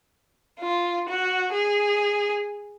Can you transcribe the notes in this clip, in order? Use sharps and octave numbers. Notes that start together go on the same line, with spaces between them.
F4
F#4
G#4